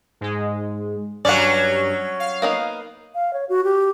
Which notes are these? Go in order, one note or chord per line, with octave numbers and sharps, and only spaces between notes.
G#2 G#3
G2 F#3 C#4 D5 F#5
F5
A#3 B3 D#4
F5
C#5
F#4
G4